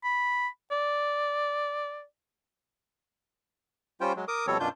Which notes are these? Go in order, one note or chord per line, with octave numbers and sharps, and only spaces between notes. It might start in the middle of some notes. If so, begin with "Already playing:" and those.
B5
D5
G3 C#4 F4 C5 G5
F#3 G#3
A#4 D6 D#6
B2 F3 G3 C4 A4 C#5
F#2 B2 D4 F4 G6